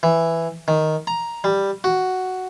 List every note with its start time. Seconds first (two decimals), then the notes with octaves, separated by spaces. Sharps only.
0.03 E3
0.68 D#3
1.07 A#5
1.44 G3
1.84 F#4